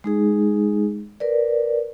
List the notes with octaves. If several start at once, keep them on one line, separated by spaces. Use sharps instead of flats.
G#3 D#4 G#4
A#4 B4 D5